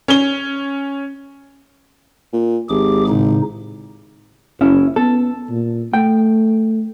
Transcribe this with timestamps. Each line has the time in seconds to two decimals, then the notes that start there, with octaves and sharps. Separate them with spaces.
0.08 C#4 G7
2.33 A#2
2.69 G#1 G4 G#4 D6
3.09 A2 C#3 D#4
4.61 F#1 C#4 E4
4.96 B3 A4
5.50 A#2
5.93 A3 G5